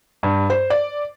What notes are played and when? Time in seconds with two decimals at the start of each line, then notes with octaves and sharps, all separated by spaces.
0.23 G2
0.50 C5
0.70 D5